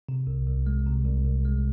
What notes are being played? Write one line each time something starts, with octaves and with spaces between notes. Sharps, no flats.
C3
C2
C2
G#3
C3
C2
C2
G#3